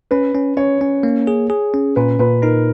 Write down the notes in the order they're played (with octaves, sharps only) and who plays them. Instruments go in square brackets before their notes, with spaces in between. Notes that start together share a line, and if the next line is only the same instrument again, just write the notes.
[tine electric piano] C#4 [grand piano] B4
[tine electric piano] C#4
[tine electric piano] C#4 [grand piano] C#5
[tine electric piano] C#4
A#3
G#4
G#4
C#4
[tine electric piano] A#2 [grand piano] B4
[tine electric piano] A#2 [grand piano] B4
[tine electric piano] D#4 [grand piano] A#4